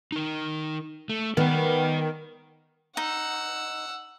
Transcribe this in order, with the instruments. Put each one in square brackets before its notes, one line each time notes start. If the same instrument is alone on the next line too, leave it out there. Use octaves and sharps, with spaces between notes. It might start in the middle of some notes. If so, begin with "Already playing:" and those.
[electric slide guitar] D#4 A#4
A3
[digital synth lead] D#3 [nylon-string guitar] B3 [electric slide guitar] D5 G5
[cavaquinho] D#4 [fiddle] F#5 E6